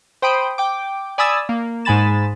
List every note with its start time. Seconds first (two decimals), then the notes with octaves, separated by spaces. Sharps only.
0.22 C5 G5 B5 D#6 D7
0.58 G5 D6
1.18 D5 G#5 B5 D#6 E6 A6
1.49 A#3
1.85 G#2 G#3 G#5 B5 A6 E7